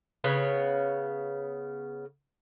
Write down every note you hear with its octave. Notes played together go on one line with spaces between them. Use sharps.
C#3 B3 C#5